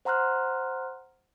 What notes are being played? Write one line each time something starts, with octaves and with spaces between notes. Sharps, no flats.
C5 F#5 A#5 C6 F6 F#6